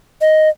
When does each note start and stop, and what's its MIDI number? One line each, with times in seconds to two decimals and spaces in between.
0.21 0.49 75